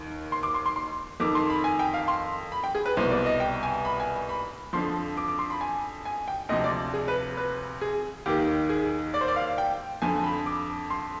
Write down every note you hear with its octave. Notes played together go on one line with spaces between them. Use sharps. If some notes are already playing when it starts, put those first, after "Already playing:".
Already playing: D#2 D#3
C6
D6
C6
C6
C6
F2 D#3 D6
C6
B5
G#5
G5
F5
C6
B5
G5
G#4
B4
C2 B2 C5
D5
D#5
G5
G#5
B5
G#5
B5
F2 D3 F3 C6
D6
D6
C6
B5
G#5
G#5
G5
D2 C3 F3 D#5
D5
G#4
B4
B4
G#4
D#2 D#3 G4
G#4
D5
C5
D5
F5
G5
F2 D3 F3 G#5
B5
D6
C6